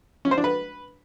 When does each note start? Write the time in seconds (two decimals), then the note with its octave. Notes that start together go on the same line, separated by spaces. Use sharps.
0.25 C#4
0.31 C5
0.38 D4
0.44 B4